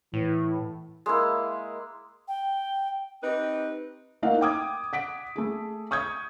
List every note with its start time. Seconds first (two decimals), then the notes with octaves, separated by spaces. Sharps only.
0.13 A2 E3
1.06 G#3 A#3 E4
2.28 G5
3.23 C4 D#4 G4 B4
4.22 A3 A#3 D#4 F5 F#5
4.41 G5 D6 D#6 G#6
4.93 F#5 B6 D7
5.36 A3 G#4
5.91 C#6 D#6 G6 G#6